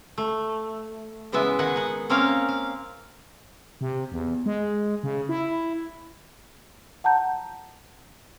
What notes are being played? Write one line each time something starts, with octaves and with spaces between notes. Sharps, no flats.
A3
C#3 E3 G#3 B3 E5
D#3 D#4 F#5 G#5
D#4 F#5
A#3 C4 C#4 A#4 C#5 F5
F5
C3
E2
G#3
C#3
E4
F#5 A5 A#5 G6